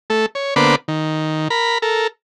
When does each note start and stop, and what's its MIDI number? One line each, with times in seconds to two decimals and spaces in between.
0.10 0.26 57
0.10 0.26 69
0.35 0.54 73
0.56 0.75 50
0.56 0.75 58
0.56 0.75 59
0.56 0.75 71
0.56 0.75 72
0.56 0.75 86
0.88 1.48 51
1.50 1.78 70
1.50 1.78 83
1.82 2.07 69
1.82 2.07 70